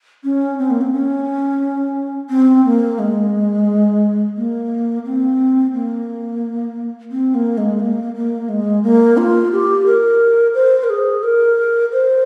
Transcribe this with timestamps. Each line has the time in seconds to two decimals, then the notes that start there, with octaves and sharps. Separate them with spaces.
0.24 C#4
0.59 C4
0.70 A#3
0.81 C4
0.93 C#4
2.30 C4
2.65 A#3
2.99 G#3
4.37 A#3
5.05 C4
5.74 A#3
7.11 C4
7.34 A#3
7.58 G#3
7.80 A#3
8.15 A#3
8.49 G#3
8.83 A#3
9.17 F4
9.52 G4
9.86 A#4
10.54 C5
10.84 A#4
10.90 G#4
11.23 A#4
11.92 C5